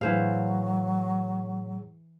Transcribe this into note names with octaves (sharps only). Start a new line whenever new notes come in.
A2 E3 F#3 G#4 C5 F5